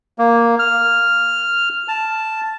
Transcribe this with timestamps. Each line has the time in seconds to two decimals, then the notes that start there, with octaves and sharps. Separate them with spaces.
0.18 A#3
0.59 F6
1.88 A5